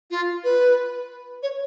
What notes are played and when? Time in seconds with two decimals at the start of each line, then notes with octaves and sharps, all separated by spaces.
0.11 F4
0.44 B4
1.43 C#5